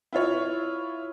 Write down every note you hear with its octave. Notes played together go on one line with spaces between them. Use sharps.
E4 F4 C#5